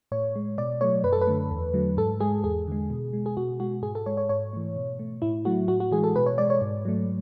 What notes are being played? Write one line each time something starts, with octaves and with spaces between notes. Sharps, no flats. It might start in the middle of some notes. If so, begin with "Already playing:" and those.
A2 C#5
G#3
B2 D5
F#3 A3 C#5
F#2 B4
A4
B4
D3 A3
E2
D3 F#3 A3
G#2 A4
G#3 G#4
E2 G#4
D3 G#3
B2
G#3
G#4
B2 F#4
G#3 F#4
G#2 G#4
A4
G#3 C#5
C#5
G#2 C#5
E3 A3
B2
A3
A2 E4
F#3 A3 F#4
A2 F#4
F#4
E3 G#3 G#4
A4
B2 B4
C#5
G#3 D5
C#5
G#2
F#3 A3